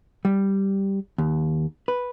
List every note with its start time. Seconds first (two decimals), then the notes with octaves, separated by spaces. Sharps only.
0.25 G3
1.18 D#2
1.88 B4